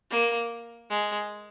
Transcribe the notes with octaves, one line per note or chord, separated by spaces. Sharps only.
A#3
G#3